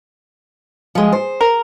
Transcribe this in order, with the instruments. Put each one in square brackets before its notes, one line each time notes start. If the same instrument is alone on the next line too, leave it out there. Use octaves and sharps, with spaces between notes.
[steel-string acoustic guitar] F3 G#3
C5
[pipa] A#4